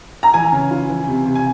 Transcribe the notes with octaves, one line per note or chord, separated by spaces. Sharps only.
A#5
E3 G#5
C#3
F4
E3
C3
C3
G#5